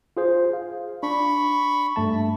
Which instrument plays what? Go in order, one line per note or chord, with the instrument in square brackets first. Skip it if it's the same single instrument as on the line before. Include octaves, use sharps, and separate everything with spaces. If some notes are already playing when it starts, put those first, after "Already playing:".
[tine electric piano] F4 G#4 C5
F5
[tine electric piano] D4 [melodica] B5 C#6
[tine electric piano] G2 A3 A5